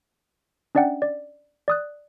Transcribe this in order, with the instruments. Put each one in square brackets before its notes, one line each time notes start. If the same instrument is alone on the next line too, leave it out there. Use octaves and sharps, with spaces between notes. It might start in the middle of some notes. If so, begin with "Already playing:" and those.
[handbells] C#4 D4 D5 E5 F#5 G5
D5
D5 D#6 F#6